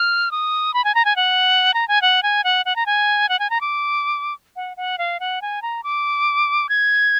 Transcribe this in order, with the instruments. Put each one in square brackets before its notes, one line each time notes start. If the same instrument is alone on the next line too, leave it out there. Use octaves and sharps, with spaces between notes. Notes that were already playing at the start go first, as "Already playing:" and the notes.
Already playing: [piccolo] F6
D#6
B5
G#5
A#5
G#5
F#5
A#5
G#5
F#5
G#5
F#5
F#5
A#5
G#5
F#5
G#5
A#5
D6
F#5
F#5
F5
F#5
G#5
A#5
D6
G#6